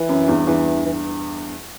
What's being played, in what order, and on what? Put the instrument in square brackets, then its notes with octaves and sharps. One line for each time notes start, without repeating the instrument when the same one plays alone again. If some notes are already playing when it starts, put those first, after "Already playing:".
Already playing: [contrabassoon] E3
[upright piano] F#2
E2 G2
[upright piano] E2 G2 [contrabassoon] E3
[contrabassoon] E3